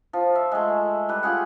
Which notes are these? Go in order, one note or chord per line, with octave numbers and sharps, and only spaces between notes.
F3
E5
G#3 A3
G3 B4
F4 G4 G#4 F#5